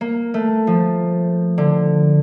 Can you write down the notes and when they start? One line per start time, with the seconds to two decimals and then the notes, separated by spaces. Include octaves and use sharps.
0.01 A#3
0.34 A3
0.67 F3
1.58 D3